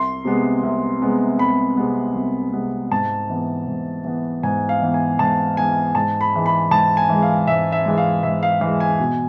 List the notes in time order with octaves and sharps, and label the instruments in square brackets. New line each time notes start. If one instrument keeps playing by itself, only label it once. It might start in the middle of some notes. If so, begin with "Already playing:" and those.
Already playing: [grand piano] C2 C6
C3 G#3 B3
C2
C3 G#3 B3
C2 B5
C3 G#3 B3
C2
C3 G#3 B3
G#2 A5
E3 B3
G#2
E3 B3
G#2 G#5
F5
E3 B3
G#5
G#2 A5
E3 B3 G#5
G#2 A5
B5
E3 G#3
B5
G#2 A5
G#5
E3 G#3
F5
G#2 E5
E5
E3 G#3
F5
G#2 E5
F5
E3 G#3 F5
G#5
B2